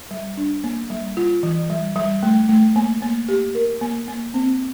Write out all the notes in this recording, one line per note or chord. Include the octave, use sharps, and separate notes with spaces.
G3
D4
A#3
G3
F4
E3
G3
G3
A3
A3
A#3
A#3
G4
A#4
A#3
A#3
C4